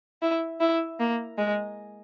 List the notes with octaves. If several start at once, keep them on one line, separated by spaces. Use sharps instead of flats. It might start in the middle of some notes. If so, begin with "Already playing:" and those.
E4
E4
A#3
G#3